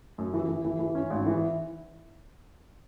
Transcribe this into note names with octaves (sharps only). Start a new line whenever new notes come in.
F#2
E3
E3
E3
E3
C#4
G#1
E3